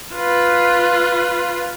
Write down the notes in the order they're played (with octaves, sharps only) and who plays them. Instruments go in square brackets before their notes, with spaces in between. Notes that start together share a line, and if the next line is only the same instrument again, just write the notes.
[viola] F4 B4